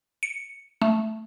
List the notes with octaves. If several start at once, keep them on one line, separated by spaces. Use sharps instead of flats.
C#7
A3